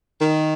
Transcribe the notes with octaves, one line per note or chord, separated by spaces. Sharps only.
D#3